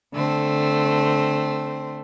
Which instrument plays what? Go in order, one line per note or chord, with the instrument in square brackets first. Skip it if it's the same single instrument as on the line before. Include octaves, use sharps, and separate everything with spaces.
[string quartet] D3 A3 C4